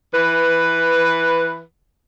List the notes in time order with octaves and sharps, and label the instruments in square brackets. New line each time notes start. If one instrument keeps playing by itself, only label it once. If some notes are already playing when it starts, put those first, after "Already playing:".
[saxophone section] E3 B4